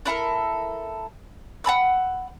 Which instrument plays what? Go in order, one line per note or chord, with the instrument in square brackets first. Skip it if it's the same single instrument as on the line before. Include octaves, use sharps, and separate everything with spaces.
[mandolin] D4 E4 A4 A#4
F#5 A5 B5 E6